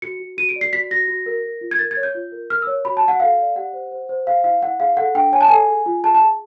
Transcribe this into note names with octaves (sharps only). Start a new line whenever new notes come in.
F#4 C#7
F#4
F#4 D#7
D7
D5
C7
F#4 B6
F#4 A#6
F#4
A#4
A#4
F4
G#6
A#4 A6
G#6
C#5
G6
F4
A#4
A#4 F6
C#5 E6
F#4 B5
A5
F#4
F#5
A4 F5
D5
G4 F#5
C5
C5
C5
G#4 F5
E4 F5
E4 F#5
G#4 F5
A4 F#5
D4 G5
C#5 G#5
A5
A4 G#5
G#4
F4
G#4 A5
A5
G#4